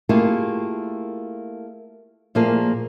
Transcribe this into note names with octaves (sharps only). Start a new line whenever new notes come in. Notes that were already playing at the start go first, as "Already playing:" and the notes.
A3 A#3 E4 F4 G4 G#4
A#2 F3 A3 A#3 G#4